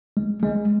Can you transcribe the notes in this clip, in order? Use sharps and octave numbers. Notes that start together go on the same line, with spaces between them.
G#3
G#3